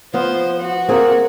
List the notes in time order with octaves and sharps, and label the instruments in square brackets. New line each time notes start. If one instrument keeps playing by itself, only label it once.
[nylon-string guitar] F3 B3 F4 [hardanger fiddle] C5
[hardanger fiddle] F#4
[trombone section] A#3 [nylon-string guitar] C4 G#4